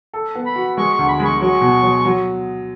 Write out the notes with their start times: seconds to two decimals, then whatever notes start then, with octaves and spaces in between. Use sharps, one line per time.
0.13 A4
0.35 B3
0.46 B5
0.55 F#4
0.77 G#3 C#6
0.93 C#6
0.99 D2
1.09 B5
1.20 G#3
1.25 C#6
1.41 F#3 C#6
1.61 B2
1.82 F#3
2.05 F#3